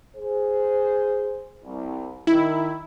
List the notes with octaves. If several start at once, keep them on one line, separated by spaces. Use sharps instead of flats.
G#4 C5
C2
D#3 E4